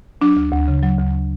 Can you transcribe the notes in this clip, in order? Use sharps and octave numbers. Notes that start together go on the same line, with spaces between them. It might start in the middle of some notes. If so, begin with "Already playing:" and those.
F#3 D4
D2
D2
C#3
F#3
D2